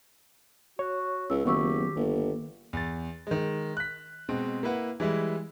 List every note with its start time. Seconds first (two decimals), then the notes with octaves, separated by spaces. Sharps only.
0.79 F#4 C#5
1.30 C#2 E6
1.45 F#1 D#3 F#3 B3 G4 C#6 E6
1.96 G1 A#3
2.73 E2 A6
3.27 D#3 G#3
3.77 F#6 B6
4.29 B2 G#3 C4
4.63 A#3 E4 B4 F#5
5.00 E3 G3 G#3 E4